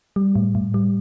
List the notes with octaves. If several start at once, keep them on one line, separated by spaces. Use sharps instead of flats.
G3
A2
A2
G3